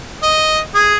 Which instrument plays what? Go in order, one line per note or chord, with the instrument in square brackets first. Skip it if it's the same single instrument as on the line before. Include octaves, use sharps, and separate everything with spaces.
[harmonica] D#5
G#4